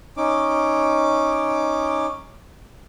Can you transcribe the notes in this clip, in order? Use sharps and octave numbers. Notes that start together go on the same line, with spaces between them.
C#4 D#4 D6